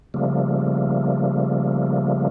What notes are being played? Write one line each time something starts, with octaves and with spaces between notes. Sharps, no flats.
C#3 F3 G3 A3 A#3